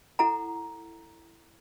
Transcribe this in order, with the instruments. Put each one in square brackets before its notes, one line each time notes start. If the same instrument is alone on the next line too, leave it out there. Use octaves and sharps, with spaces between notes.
[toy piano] E4 A4 F#5 A#5